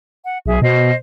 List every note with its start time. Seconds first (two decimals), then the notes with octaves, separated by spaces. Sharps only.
0.24 F#5
0.46 B1 G#4 E5
0.62 B2 C5 D#5